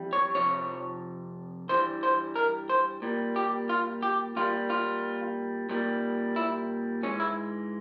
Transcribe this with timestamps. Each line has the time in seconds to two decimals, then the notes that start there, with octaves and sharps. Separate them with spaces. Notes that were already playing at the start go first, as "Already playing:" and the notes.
Already playing: F2 E3 G3
0.13 C#5
0.35 F2 C3 F3 C#5
1.69 G2 E3 G3 C5
2.03 C5
2.36 A#4
2.70 C5
3.02 A#2 G3
3.36 G4
3.69 F4
4.03 G4
4.36 A#2 G3 F4
4.70 F4
5.69 A#2 G3
6.36 E4
7.03 G#2 E3 G#3 C#4
7.20 E4